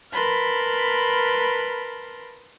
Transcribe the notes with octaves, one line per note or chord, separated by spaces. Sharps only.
A#4 B4 A5 B5 C6 F6